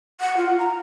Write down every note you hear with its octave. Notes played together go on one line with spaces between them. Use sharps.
F#5
F4
A#5